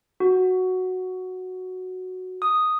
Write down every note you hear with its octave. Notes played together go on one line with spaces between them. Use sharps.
F#4
D#6